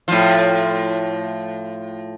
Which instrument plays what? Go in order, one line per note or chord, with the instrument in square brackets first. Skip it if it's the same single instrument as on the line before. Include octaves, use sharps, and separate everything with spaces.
[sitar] A2 F3